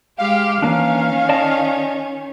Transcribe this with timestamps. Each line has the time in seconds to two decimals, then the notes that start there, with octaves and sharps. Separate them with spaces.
0.18 G#3 G4 F5
0.62 D#3 E3 A#3 C#4 D4
1.29 D5 D#5 A5